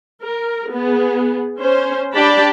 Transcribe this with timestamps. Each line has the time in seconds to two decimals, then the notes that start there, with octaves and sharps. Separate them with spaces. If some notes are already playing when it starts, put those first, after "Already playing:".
0.21 A#4
0.70 B3 G#4
1.58 C#4 C5
2.14 D4 G4 D5 G5 A5 B5